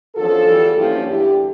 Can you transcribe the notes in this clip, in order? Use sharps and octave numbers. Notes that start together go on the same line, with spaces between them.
E2 D3 F3 C#4 F4 A4
E2 E3 G3
G2 F3 A#3 C#4 E4 G4
E2 D3 G3 E4 G4